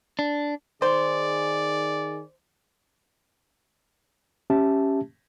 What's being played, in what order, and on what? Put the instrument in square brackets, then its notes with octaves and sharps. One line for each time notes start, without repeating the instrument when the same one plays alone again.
[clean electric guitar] D4
[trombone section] D#3 G#4 [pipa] C5 [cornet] D5
[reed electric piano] C#4 G4 E5 A5